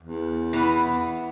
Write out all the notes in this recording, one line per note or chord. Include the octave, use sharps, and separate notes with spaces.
E2
E3 B3